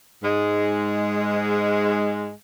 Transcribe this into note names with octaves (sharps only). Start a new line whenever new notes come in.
G#2 G#3